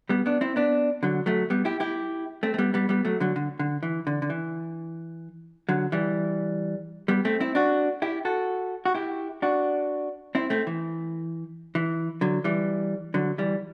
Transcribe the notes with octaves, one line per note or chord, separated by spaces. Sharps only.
G3 B3
B3 D4
C4 E4
B3 D4
D3 F#3
F#3 A3
G3 B3
E4 G4
E4 G4
A3 C4
A3
G3 B3
G3 B3
G3 B3
F#3 A3
D3 F#3
D3
D3
E3
D3
D3
E3
D3 F#3
E3 G3
G3 B3
A3 C4
C4 E4
D4 F#4
E4 G4
F#4 A4
F#4
E4 G4
D4 F#4
C4 E4
A3 C4
E3
E3
D3 F#3
E3 G3
D3 F#3
E3 G3